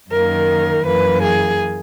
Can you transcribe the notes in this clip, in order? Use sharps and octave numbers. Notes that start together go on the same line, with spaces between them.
F#2 D#3 A#3 A#4
F#2 E3 A#3 B4
G#4